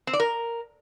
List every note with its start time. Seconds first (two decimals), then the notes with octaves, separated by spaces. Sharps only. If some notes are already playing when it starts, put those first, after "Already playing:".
0.07 C4
0.13 D5
0.20 A#4